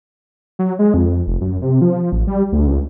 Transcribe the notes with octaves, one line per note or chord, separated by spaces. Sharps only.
F#3
G#3
F2
F1
F#2
C3
F3
A1
G3
D2
C#2